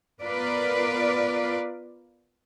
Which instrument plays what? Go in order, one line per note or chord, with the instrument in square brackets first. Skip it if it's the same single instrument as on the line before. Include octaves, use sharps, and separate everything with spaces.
[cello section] B3 F4 A#4 B4 D5